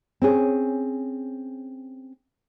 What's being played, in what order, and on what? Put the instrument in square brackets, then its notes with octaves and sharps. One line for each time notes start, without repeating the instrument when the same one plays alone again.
[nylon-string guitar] C4 C#4 G#4